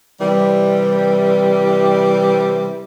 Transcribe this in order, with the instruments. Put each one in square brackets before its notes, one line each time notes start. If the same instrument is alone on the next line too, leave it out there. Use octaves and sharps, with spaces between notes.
[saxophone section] C3 E3 G3